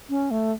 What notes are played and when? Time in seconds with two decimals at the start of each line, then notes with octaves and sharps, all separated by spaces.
0.09 C#4
0.31 A3